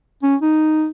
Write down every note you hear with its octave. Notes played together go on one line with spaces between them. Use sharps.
C#4
D#4